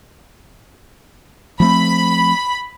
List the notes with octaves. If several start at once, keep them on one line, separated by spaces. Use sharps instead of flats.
F3 A3 C4 B5